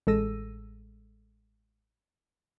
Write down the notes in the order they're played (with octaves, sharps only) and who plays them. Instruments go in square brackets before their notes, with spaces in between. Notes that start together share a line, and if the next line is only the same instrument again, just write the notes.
[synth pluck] A1 G#3 A4 E6 A#6 D#7